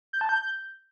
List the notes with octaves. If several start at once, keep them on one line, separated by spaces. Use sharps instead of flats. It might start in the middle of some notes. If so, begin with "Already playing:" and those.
G6
A5
G6